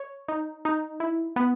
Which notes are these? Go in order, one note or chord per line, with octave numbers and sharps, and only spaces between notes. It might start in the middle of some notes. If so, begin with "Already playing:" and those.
Already playing: C#5
D#4
D#4
E4
B3